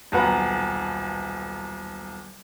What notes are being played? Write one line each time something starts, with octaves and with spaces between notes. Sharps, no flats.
D#1 B1 B3 B4 F#5 A#5